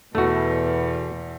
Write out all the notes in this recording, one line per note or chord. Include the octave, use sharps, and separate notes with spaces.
E2 B2 A3 F#4